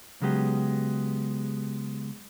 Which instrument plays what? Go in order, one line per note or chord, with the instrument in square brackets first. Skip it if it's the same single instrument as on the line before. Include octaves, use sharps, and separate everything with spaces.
[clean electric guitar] C#3 F#3 G#3 B3 G4